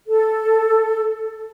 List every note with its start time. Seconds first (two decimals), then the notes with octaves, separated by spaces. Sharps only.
0.07 A4